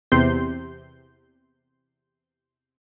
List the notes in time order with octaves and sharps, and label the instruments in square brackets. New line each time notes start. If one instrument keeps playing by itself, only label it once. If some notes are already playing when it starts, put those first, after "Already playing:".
[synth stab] E2 C3 C6 G6